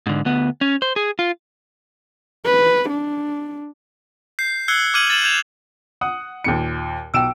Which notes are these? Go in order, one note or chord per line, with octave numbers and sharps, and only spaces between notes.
G#2 D3
D2 B3
C#4
C5
G#4
F4
B4
D4
G6 C7
E6 F#6 G#6 C7 C#7 G7
D6 F6 G#6 D#7 F#7
A6 E7 F#7
G6 G#6 E7 F7
F#5 D#6
D#2 A#2 C#7
B1 G5 E6 D7 E7